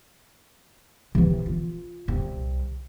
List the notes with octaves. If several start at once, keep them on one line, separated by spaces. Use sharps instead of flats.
C3 E3
F4
C2 C3